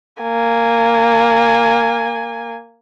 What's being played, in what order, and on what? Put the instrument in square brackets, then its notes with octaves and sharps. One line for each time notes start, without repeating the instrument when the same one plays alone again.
[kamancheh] A#3 G#5